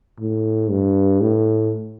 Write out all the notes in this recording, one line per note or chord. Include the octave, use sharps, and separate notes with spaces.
A2
G2
A2